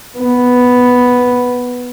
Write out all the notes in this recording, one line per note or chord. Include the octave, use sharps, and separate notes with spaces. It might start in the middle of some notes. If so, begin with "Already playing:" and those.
B3